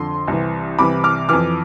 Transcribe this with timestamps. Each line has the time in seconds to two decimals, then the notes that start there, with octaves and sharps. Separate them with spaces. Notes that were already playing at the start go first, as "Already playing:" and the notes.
Already playing: F2 D3 C6
0.28 C2 C3 E3
0.79 C2 C3 E3 B5 D6
1.04 D6 F6
1.29 F2 E3 D6 F6